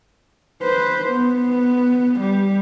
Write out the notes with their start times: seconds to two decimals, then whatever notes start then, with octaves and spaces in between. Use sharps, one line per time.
0.63 B4 C5
1.10 B3
2.20 G3